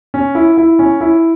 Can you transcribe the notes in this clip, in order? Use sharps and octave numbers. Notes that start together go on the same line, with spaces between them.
C#4
E4
E4
C#4
E4